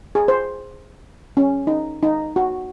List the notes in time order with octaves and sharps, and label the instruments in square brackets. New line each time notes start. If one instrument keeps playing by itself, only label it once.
[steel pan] G#4
C5
C#4
D#4
D#4
F#4